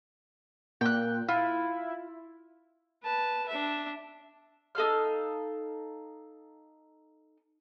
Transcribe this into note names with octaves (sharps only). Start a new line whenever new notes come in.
A#2 G5 F#6
E4 F4
B4 A5
D4 E5
D#4 A4 F5 F6